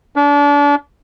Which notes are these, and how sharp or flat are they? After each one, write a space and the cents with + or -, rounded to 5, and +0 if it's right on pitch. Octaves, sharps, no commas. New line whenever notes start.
D4 -30